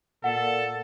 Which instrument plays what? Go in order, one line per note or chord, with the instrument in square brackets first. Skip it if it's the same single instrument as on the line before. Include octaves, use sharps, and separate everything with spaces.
[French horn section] A#2 [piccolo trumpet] A4 [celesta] F#5